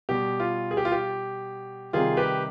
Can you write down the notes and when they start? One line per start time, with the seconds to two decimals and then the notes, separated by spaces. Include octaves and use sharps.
0.09 B2 G3 G4
0.40 F4
0.71 G#4
0.77 G4
0.85 F4
0.92 G4
1.93 C3 D#3 G3 F4 G#4
2.17 G4 B4